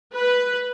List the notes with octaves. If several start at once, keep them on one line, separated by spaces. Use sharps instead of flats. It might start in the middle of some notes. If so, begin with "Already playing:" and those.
B4